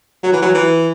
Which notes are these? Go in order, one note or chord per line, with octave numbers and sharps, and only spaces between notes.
F#3
E3
F#3
E3